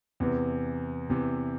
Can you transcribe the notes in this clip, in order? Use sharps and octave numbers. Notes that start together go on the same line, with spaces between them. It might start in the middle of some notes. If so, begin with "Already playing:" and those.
E2 C3 E3
E2 C3 E3